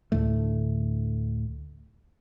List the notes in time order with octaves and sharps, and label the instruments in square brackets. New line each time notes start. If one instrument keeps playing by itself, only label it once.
[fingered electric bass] D2 A2 D3 A3